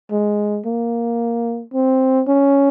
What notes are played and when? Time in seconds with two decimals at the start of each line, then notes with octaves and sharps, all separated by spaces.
0.11 G#3
0.66 A#3
1.74 C4
2.28 C#4